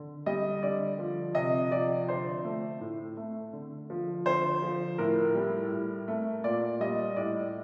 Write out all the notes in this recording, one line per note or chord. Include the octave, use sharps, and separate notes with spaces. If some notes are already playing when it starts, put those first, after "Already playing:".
Already playing: D3
G3 D#5
D3 D5
F3
C3 D#5
F3 D5
D3 C5
A3
A2
A3
D3
F3
D3 C5
F3
A2 A#4
G3
A2
A3
A#2 D5
G3 D#5
A2 D5